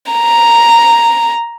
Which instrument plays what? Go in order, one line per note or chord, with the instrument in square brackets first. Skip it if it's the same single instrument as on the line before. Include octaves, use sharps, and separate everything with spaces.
[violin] A#5